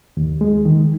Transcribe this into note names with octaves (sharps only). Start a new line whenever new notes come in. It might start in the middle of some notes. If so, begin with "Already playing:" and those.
D#2
G#3
D#3